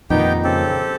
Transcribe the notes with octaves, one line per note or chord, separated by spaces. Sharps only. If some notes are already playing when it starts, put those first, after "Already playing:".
F2 A#2 D#3 B3 D#4 G4 G5
C#3 C4 G4 A4